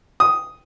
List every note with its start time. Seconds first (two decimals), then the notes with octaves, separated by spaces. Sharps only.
0.20 D#6